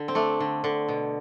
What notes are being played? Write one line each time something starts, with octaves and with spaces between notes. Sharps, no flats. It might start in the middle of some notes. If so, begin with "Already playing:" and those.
Already playing: D3
C4
A3 D4
D3
D3
B2